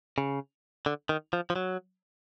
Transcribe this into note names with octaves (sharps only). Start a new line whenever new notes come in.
C#3
D3
D#3
F3
F3
F#3